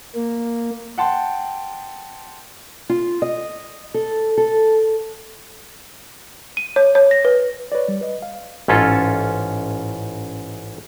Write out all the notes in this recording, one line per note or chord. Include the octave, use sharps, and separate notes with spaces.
A#3
F#5 G5 A5 C6
F4
D#5
A4
A4
D#7
C#5
C#5
A#6
B4
B4 C#5 D5
G3
B4 D#5
F5
A1 G#2 C#4 F4 A4